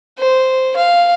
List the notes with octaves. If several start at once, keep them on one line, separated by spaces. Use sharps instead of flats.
C5
F5